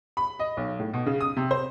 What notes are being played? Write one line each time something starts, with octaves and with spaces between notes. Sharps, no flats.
B5
D#5
B1
A2
B2
C#3
D#6
C3
C5